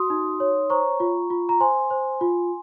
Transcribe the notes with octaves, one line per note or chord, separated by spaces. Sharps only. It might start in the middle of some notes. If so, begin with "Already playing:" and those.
Already playing: F#4 C6 D#6
D#4
C#5
C5 A#5 C#6
F4
F4
A#5
C5 G#5 C6
C5
F4